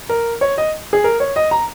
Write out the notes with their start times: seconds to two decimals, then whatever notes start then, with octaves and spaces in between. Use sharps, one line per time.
0.09 A#4
0.41 C#5
0.58 D#5
0.93 G#4
1.04 A#4
1.20 C#5
1.36 D#5
1.51 A#5